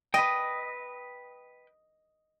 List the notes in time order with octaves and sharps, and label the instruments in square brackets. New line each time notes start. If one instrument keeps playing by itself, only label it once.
[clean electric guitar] B4 G5 [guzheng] D#5